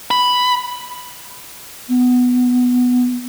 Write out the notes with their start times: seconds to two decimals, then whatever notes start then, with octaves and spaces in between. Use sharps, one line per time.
0.11 B5
1.89 B3